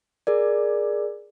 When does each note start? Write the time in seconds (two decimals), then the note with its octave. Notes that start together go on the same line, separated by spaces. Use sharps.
0.27 G#4 A#4 D5